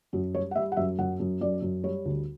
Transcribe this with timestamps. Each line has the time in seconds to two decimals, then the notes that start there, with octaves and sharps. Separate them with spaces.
0.13 F#2 F#4
0.34 G3 C#5
0.51 F#5
0.55 G3 E5
0.72 F#5
0.77 F#2 E5
0.99 F#2 F#5
1.20 F#2
1.41 F#2 D5
1.62 F#2
1.84 G3 C#5
2.05 D2